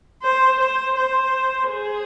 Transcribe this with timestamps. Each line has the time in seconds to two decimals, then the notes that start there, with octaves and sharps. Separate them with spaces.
0.23 C5
0.60 C5
0.97 C5
1.70 G#4